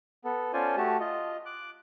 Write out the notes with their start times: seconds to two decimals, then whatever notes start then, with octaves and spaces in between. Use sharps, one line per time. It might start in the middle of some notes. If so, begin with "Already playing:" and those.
0.25 B3 A4
0.53 C#4 F4 A4 C5 D5 G#5
0.77 A3 F#4 G4 A5
1.00 F4 D#5
1.46 D6 F#6